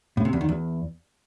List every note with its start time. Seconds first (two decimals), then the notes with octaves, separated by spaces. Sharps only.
0.17 A2
0.25 C3
0.33 E2
0.41 D#3
0.49 E2